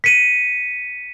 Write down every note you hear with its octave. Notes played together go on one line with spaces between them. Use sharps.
B6 C#7 D#7